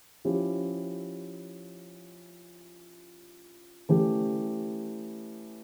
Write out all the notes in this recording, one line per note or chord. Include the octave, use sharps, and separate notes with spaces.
F3 C#4 E4 G4
E3 A3 C#4 G4